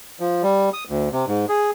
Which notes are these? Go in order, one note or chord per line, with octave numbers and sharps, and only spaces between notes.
F3
G3
D#6
D2
C3
G#2
G#4